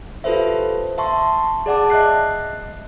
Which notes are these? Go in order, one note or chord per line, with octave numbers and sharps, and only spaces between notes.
F4 G4 A4 B4 C5 E5
E5 A5 C6 C#6
G#4 D5 F#5 A5 D6
D#5 E5 F#6 C7